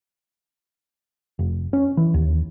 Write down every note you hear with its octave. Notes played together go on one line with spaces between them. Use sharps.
F1
C#4
E3
D#2